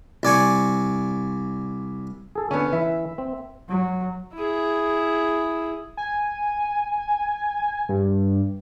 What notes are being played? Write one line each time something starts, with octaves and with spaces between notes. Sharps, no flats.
C2 D5 G#5 C#6
G#4 A4
D3 B3 C#4
E3 E4 E5
C4
F#3
E4 G#4
G#5
G2